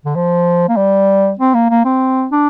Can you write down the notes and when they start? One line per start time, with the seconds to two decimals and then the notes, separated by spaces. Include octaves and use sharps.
0.05 D3
0.16 F3
0.69 A#3
0.77 G3
1.39 C4
1.54 A#3
1.70 A#3
1.85 C4
2.32 D4